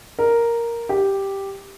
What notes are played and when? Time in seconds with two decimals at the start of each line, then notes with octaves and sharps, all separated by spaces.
0.19 A#4
0.89 G4